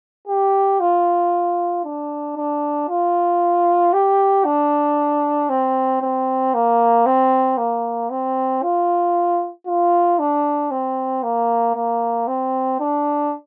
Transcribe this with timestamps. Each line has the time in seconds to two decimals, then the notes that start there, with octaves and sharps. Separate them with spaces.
0.28 G4
0.80 F4
1.84 D4
2.37 D4
2.89 F4
3.93 G4
4.45 D4
5.49 C4
6.02 C4
6.54 A#3
7.06 C4
7.58 A#3
8.10 C4
8.63 F4
9.67 F4
10.19 D4
10.71 C4
11.23 A#3
11.75 A#3
12.27 C4
12.80 D4